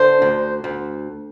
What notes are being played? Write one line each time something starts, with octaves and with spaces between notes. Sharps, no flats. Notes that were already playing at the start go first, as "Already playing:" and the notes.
Already playing: D3 C5
D2
D2